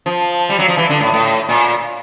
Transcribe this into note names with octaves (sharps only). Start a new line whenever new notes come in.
F3
G3
F#3
F3
E3
D3
A2
A2
A#2